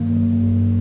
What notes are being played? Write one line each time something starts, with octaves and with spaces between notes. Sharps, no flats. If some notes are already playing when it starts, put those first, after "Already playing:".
Already playing: G2 D#3 F#3 A#3
F#3
G2